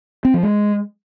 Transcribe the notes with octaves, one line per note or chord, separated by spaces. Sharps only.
C4
F3
G#3